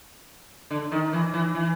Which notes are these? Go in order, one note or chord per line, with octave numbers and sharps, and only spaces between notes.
D3
D#3
E3
E3
E3